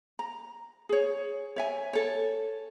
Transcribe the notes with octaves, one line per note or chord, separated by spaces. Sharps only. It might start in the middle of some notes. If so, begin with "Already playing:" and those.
A#5
G#4 C#5
C#5 E5 G#5
A4 C#5